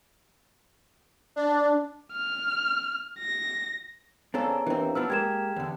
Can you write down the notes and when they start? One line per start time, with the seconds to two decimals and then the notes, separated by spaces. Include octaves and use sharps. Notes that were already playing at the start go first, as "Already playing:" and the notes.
1.36 D4
2.13 F6
3.19 A#6
4.34 C#3 B3 C4 D4 A4 A#5
4.66 D#2 E3 C4 D4
4.95 F3 B3 D4 E6 F6
5.10 G#3 A#3 G4 G#6 E7
5.56 E2 D3